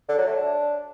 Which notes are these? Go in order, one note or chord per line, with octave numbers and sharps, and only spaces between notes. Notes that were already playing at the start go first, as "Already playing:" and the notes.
D3
F#3
A3
D4